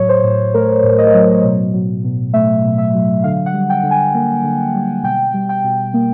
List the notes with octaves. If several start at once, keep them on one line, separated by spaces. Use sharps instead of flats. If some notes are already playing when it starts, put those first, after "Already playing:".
Already playing: A2 F#3 C#5
C5
A2
A3 A#4
A2
D#5
F#3
B2
F#3
B2
A3 E5
B2
E5
F#3
D3 F5
F#5
G3
G5
D3
G#5
A#3
D3
G3
B2 G5
G3
G5
B2
A#3